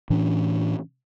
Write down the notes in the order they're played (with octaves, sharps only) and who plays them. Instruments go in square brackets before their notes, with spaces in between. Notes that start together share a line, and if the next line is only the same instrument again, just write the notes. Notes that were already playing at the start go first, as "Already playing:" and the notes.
[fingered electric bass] A2 E3 C#4 D4